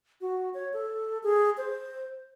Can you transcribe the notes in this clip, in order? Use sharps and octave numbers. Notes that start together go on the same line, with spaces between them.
F#4
C#5
A4
G#4
C5